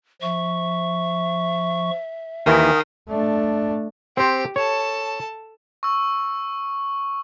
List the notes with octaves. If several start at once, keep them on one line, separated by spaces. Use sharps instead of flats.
F3 E5 C#6
D#2 D#3 E3 F5 G#5 D#6
A3 D4
C4 G4 C5
A4 C#5 A5
C#6 E6